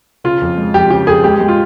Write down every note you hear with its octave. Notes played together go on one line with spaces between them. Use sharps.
C#3 F4
F2
G#3
F2 G4
C#3 G4
F2 G#4
G#3 G4
G#3
F4